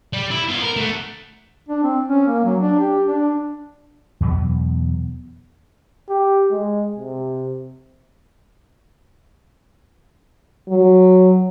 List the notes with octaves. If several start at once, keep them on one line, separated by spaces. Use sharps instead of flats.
G3
E4
B3 F4
A#4
A3 F#4
D4
C4
C#4
A#3
F#3
D4
G4
D4
E2 B2 F#3 B3
G4
G#3
C3
F#3